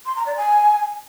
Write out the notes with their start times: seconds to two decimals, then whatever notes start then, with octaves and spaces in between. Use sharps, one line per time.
0.06 C6
0.16 A#5
0.26 D5
0.37 G#5